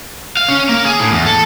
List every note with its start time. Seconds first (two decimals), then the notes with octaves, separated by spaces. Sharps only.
0.37 F5
0.49 C#4
0.69 A#3
0.85 G#4
0.99 A2
1.11 E2
1.26 A4